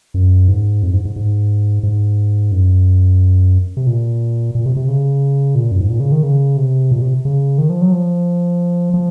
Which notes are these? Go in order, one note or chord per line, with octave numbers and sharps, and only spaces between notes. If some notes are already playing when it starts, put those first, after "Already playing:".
F#2
G#2
F2
G#2
G#2
G#2
G#2
F#2
C3
A#2
A#2
C3
C3
C#3
A#2
F#2
G#2
A#2
C#3
D#3
C#3
C3
A#2
C3
C#3
D#3
F3
F#3
F3
F3